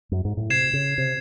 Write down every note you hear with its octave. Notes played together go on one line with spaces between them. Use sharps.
F#2
G#2
A2
C3 G#6 C7 E7
C#3
C3